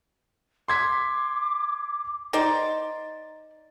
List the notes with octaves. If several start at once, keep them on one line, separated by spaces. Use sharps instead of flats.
C6 D6 G#6 B6
D#4 C5 D5